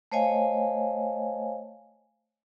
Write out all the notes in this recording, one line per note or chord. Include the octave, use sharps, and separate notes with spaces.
A3 C5 C#5 D#5 F5 G#5